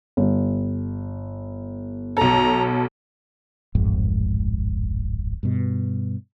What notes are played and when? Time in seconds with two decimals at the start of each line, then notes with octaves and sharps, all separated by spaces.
0.17 G1
2.17 B1 A4 A#5
3.75 D1 G#1 F2 G#2
5.43 G2 B2